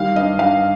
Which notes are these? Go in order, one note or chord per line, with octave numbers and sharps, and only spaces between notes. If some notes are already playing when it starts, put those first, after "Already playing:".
Already playing: D#3 G3 F5
G2 D#5
G2 F5